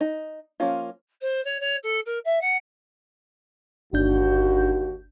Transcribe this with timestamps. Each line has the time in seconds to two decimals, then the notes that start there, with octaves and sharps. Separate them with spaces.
0.01 D#4
0.60 F3 A#3 C#4 F4
1.21 C5
1.44 C#5
1.60 C#5
1.83 A4
2.05 A#4
2.25 E5
2.41 F#5
3.93 G1 D#2 D4 F#4 G6